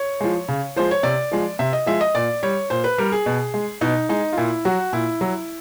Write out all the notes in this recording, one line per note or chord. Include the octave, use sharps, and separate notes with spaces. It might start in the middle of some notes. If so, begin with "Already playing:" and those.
Already playing: C#5
F3 G#3
C#3
F3 G#3 C5
C#5
C3 D5
F3 G#3
C3 E5
D#5
F3 G#3 E5
D#5
A#2 D5
G3 C#5
A#2 C5
B4
G3 A#4
G#4
B2
G#3
B2 D#4
G#3 D#4
F4
A#2 E4
F#3 F#4
A#2 E4
F#3